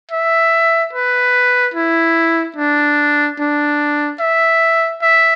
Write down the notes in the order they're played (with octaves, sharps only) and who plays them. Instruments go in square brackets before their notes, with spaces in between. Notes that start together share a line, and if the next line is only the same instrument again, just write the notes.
[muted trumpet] E5
B4
E4
D4
D4
E5
E5